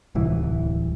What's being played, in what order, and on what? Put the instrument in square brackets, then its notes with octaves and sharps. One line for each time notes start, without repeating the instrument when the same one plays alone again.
[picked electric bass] D1 C2 E3